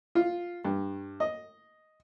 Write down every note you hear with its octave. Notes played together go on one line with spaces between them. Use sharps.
F4
G2
D#5